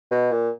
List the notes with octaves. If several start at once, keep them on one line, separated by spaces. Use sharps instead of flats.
B2
A#2